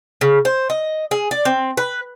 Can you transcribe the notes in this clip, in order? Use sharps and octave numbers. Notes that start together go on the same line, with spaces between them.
C#3
C5
D#5
G#4
D5
C4
B4